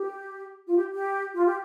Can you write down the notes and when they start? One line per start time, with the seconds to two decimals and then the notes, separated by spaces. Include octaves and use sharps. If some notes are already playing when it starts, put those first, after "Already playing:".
Already playing: G4
0.67 F4
0.76 G4
0.93 G4
1.35 F4
1.46 G4